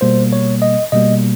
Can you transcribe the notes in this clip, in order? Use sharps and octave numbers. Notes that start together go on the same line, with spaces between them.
B2 G3 A#3 C5
C#5
D#5
B2 G3 A#3 D#5